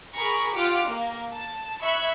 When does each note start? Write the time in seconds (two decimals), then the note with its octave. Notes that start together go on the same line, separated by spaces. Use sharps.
0.14 G#4 A#4 A#5 B5 C#6
0.53 F4 G4 F#5 D6 F6 D7
0.87 A#3 A#4
1.33 A5
1.83 E5 B5 C#6 F#6 G#6